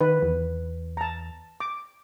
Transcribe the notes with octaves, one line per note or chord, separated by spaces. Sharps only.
D#3 B4
E2
A5 A#5
D6